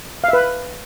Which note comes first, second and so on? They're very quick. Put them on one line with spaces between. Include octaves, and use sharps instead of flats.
F5 E5 B4